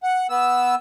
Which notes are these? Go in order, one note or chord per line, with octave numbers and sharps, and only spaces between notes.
F#5
B3 E6